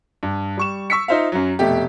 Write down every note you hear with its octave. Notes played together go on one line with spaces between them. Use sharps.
G2
G3 C#6 E7
C#6 E6 B6 C#7
D#4 F4 C5 E5 F5
F#2 F#3
F1 B2 A3 G4